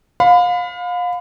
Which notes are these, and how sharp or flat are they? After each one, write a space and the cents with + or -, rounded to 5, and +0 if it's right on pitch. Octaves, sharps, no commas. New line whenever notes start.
F5 +30 B5 +30